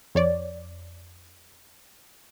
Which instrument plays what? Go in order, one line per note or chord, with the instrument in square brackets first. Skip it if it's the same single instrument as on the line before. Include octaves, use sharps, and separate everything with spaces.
[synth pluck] F2 C#5 D5